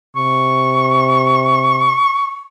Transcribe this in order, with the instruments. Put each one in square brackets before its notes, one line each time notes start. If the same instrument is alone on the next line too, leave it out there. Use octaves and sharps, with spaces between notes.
[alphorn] C3 [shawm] C#6